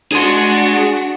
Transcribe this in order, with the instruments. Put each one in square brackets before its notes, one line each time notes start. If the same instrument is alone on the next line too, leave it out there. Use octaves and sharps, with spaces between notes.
[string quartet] D4 F#4 [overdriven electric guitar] G#4 C6